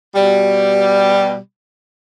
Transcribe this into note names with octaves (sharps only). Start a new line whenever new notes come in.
B2 G3